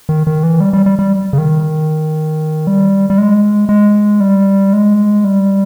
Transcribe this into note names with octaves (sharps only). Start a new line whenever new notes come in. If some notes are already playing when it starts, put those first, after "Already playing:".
D#3
D#3
E3
G3
G3
G3
G3
C#3
D#3
G3
G3
G#3
G#3
G3
G#3
G3